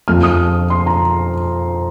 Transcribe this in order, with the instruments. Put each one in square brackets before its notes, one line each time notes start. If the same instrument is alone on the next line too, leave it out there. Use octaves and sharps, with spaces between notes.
[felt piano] F2 F3 F6
D#6
C6
A#5